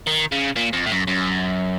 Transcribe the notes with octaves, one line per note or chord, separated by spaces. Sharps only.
D#3
C#3
A#2
F2
A2
F#2
F#2